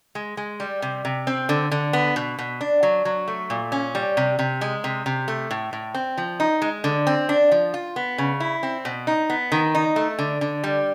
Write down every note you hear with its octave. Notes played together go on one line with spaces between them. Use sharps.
G#3
G#3
G3
C3
C3
C4
D3
D3
B3
B2
B2
D4
F#3
F#3
A3
A#2
C#4
G3
C3
C3
G#3
C3
C3
A3
A2
A2
C4
F3
D#4
G#3
D3
C4
D4
F3
F4
B3
C#3
E4
C4
B2
D#4
B3
D#3
D#4
A3
D3
D3
G3